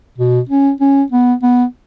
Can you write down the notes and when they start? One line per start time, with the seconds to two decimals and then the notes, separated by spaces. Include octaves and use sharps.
0.18 B2
0.49 C#4
0.81 C#4
1.12 B3
1.42 B3